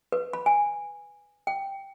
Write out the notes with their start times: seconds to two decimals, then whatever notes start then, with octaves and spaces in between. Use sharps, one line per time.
0.12 B4
0.33 B5
0.46 G#5
1.47 G5